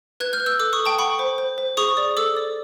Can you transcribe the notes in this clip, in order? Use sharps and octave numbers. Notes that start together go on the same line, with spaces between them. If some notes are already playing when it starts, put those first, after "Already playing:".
B4 F#6 G#6
F6 G6
B4
E6 F#6
A4 D6 E6
C#6 D#6
A4
G5 A5
F#5 B5 C#6
C5
C5
C5
G#4 C#6 D#6
D5
A4 D6 E6
D5